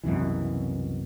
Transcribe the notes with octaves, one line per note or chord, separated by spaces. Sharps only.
C2 F#2 B2 E3